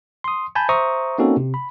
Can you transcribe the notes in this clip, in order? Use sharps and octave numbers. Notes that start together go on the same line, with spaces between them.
C6 D#6
G#5 A5 B5 G6
C5 E5 A#5 C#6 D#6
A#3 C4 C#4 D#4 F#4 A4
C3
B5